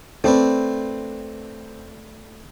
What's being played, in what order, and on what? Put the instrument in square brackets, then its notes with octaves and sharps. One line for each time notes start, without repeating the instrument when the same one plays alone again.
[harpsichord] A3 D4 B4 [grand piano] C4